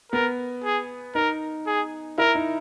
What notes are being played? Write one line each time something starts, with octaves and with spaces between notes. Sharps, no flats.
B3 A#4
G#4
D#4 A#4
G#4
E4 A#4
D#4